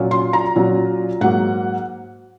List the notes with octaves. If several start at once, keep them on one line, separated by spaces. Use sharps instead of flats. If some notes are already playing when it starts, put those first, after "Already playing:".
Already playing: A#2 F#3 C#4 F4
C6
A#5
A#2 F#3 C#4 F4
G#2 F#3 A#3 F#5